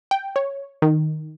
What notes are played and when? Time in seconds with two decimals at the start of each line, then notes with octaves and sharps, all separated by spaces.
0.11 G5
0.36 C#5
0.82 D#3